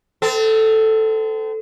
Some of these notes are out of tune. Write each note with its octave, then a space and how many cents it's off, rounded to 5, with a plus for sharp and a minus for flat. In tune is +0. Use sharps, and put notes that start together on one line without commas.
C4 -35 A4 +0